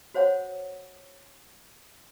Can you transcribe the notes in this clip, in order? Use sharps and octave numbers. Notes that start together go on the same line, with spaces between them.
F#4 C5 C#5 F#5